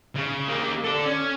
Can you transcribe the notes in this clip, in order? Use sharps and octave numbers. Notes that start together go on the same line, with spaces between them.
C#3
A#3 G4
A4 D5
C#4